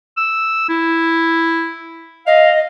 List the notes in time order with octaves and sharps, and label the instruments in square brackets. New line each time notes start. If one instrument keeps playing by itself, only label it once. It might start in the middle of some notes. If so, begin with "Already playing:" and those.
[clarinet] E6
E4
[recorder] D#5 [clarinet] F5